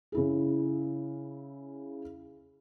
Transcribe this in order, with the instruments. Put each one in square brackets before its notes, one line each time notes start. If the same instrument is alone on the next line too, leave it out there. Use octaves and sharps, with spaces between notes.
[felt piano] C#3 E4 G#4